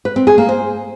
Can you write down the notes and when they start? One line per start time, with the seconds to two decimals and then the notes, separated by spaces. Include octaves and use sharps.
0.05 B4
0.16 C4
0.27 G#4
0.38 A#3
0.49 C5